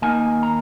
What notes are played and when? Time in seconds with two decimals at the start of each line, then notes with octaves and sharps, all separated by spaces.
0.02 D#2 D#3 A#3 D#4 G#5
0.43 A#5